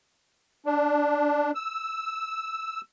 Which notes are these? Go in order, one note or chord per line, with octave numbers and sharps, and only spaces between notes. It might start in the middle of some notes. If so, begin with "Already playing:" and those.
D4
E6